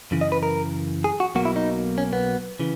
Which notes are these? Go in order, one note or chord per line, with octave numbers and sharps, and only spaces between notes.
F#2 C#3 E3
D#5
B4
A#4
G#4
F#4
B1 B2 F#3 A#3 F#4
E4
D#4
C#4
B3
C#3 E3